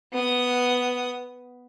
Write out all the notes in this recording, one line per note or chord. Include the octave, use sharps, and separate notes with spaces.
B3 D#6